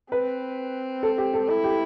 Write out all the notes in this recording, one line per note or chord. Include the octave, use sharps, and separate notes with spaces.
C4 B4
A4
G4
A4
E4 A4
G4